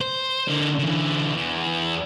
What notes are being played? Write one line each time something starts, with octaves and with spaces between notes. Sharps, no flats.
C5
D3 A#3
D3 E3
E2